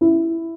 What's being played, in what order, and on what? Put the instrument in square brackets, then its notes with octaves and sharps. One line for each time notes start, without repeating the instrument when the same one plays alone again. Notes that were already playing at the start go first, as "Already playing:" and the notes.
[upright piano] E4